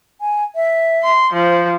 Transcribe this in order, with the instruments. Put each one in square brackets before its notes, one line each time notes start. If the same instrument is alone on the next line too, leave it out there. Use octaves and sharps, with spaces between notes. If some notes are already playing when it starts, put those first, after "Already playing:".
[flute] G#5
E5
[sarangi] C6
[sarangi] F3 [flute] C5